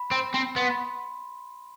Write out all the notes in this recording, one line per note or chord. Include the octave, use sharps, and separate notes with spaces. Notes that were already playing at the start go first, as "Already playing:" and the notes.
Already playing: B5
C4
C4
B3 C6
B5